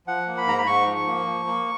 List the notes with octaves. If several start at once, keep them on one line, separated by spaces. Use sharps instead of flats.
F3 F#5
A#3
B5
G#2 A#5
B5
G#2 C#6
F3
A#3
F3
A#3